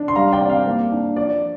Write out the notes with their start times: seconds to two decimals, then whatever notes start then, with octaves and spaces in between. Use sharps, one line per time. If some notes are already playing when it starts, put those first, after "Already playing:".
Already playing: D4
0.08 C6
0.16 G3 F5 A#5
0.33 D5 G5
0.41 C4
0.50 F5
0.67 A#3
0.91 D4
1.16 F3 D5